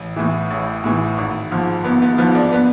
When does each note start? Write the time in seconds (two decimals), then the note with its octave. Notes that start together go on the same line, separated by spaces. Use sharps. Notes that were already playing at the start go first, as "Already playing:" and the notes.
Already playing: A1
0.16 A2 E3
0.51 A1
0.84 A2 E3
1.18 G#1
1.51 G#2 F3
1.84 G#1 B3
2.02 B3
2.18 G#2 F3 B3
2.35 D4
2.52 B3